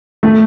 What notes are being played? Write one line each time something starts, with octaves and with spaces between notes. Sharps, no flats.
A3